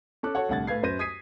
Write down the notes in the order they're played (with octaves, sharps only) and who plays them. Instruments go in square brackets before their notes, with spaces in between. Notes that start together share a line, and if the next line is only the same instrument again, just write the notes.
[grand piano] C#4 A4 D6 F#6
F#4 A4 C#5 F#5
C2 A2 D3 F#5 G#6 A6
A2 B4 F5 G#6 C7
F#2 B4 C5 A#6 D#7
D#6 G#6 B6 C7 D#7